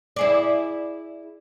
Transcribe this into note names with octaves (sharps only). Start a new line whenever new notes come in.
E4 G#4 D5